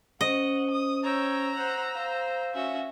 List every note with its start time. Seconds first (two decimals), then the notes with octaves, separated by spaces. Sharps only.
0.21 C#4 C5 D#5 F#5
0.70 D#6
1.04 C#5 G5 A#5 E6
1.54 C5 F#5
1.95 C5 F5
2.55 C#4 F#4 E5